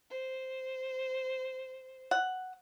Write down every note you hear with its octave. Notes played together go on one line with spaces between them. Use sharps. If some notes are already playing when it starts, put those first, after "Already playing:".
C5
F#5